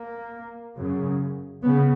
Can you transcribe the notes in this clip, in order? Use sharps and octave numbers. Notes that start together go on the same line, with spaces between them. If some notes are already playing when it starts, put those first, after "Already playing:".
Already playing: A#3
F#2 C#3
C#3 B3